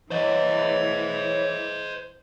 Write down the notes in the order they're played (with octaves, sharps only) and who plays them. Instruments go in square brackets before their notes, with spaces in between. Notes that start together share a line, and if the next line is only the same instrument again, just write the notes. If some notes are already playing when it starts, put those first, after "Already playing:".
[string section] E3 [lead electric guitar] C5 D#5 [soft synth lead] C#5